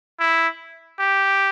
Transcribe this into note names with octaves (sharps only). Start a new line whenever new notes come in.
E4
G4